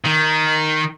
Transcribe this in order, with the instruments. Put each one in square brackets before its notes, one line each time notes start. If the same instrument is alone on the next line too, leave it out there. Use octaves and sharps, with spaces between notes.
[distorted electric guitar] D#3